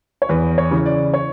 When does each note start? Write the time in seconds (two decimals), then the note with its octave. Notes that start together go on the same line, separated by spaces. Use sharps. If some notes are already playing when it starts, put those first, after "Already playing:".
0.22 C#5
0.29 E2 B4
0.58 C#5
0.71 C#3 E3
0.86 D5
1.14 C#5